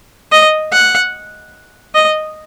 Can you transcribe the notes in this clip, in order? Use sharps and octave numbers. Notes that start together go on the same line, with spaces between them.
D#5
F#5
D#5